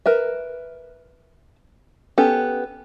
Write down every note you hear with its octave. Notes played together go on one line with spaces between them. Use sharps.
A#4 B4 E5
B3 C#4 G4 A4